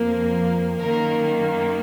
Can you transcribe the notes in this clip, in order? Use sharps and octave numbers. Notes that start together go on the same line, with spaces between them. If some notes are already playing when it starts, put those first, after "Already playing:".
Already playing: F2 F3 A#3
F#2 D#3 A#3 A#4